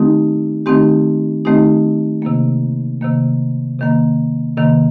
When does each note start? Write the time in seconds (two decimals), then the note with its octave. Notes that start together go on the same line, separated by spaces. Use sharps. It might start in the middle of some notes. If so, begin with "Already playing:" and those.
Already playing: D#3 A3 C4 D#4 G4
0.66 D#3 A3 C4 D#4 G4
1.45 D#3 A3 C4 D#4 G4
2.22 C3 D#3 A#3
3.01 C3 D#3 A#3
3.79 C3 D#3 A#3
4.57 C3 D#3 A#3